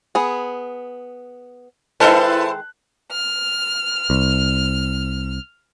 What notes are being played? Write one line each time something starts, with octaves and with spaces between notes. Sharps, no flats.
B3 G#4
D#3 G#3 E4 A4 B4 C5 A5 F#6
F6
C2